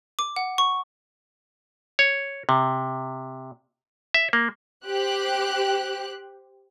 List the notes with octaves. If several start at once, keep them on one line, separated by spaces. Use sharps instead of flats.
D6
F#5
C#6
C#5
C3
E5
A#3
G4 C5 F#6